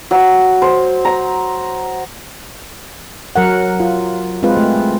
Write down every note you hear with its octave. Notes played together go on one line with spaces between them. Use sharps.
F#3
C5
A#5
F#3 A#4 F#5
F4
G#3 C4 F4 B4
A3